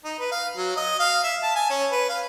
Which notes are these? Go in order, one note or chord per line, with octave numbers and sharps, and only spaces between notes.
D#4
B4
F5
F#3
D#5
F5
E5
A5
G#5
C#4
B4
F5